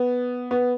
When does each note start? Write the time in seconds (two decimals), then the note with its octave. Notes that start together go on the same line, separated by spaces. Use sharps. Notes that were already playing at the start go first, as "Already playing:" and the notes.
Already playing: B3
0.51 B3